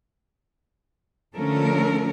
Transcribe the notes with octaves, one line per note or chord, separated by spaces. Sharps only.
D3 F3 A3 C#4 A4 A#4